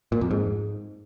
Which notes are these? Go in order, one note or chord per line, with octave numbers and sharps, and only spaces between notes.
A#2
F2
G#2